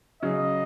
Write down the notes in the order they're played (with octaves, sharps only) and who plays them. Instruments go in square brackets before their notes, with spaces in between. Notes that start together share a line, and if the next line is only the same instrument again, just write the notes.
[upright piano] C#3 F#3 C#4 [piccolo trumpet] D#5